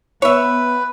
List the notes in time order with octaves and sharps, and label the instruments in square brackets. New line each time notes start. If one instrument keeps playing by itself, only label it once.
[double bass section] B3 [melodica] B4 [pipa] C#5 E5